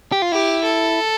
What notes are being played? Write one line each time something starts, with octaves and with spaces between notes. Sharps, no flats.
G4
F4
E4 G4
A4